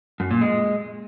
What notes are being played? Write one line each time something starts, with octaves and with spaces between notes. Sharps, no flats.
F#2
A#2
G#3